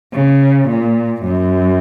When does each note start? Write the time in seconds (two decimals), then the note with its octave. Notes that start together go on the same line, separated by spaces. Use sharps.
0.14 C#3
0.69 A#2
1.24 F#2